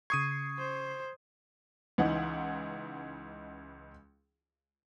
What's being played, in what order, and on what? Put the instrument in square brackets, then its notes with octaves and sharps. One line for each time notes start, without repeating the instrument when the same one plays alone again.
[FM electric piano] C#3 C7 [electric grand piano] C#6 D#6 D#7 [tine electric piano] G#6
[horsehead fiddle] C5
[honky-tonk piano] C#2 E3 D#4 F#5